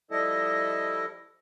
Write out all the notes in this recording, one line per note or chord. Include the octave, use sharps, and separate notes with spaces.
F3 G3 E4 A4 D#5